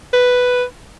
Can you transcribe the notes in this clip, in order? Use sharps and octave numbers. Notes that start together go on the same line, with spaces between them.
B4